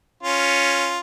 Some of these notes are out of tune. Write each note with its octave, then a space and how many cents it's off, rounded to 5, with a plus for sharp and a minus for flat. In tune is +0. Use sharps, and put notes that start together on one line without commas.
C#4 +0 F4 +0